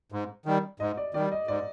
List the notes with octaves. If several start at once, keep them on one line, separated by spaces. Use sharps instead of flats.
G#2
D#3 G3
G#2 D#5
D5
D#3 G3 D5
D#5
G#2 D5